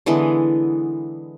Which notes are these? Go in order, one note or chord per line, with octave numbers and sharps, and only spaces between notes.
D3 E3 G#3 B3